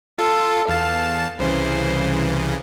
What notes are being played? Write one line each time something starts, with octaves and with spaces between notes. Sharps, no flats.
F4 A4
E2 F5 A5
C2 C#3 E3 C5